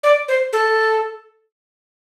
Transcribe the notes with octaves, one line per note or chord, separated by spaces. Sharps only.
D5
C5
A4